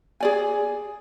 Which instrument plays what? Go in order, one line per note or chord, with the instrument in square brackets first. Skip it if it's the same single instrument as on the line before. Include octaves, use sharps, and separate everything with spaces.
[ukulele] G#4 D5 G#5